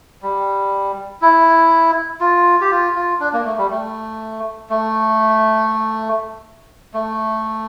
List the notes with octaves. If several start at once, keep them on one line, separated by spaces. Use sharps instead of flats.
G3
E4
F4
G4
F4
F4
D4
A#3
A3
G3
A3
A3
A3